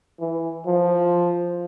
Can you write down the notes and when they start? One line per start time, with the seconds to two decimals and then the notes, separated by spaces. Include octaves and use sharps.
0.20 E3
0.66 F3